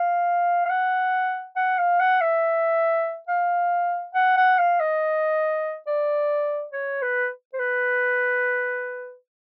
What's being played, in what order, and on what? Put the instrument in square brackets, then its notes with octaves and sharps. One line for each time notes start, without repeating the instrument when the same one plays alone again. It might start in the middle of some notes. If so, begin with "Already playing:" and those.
Already playing: [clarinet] F5
F5
F#5
F#5
F5
F#5
E5
F5
F#5
F#5
F5
D#5
D5
C#5
B4
C5
B4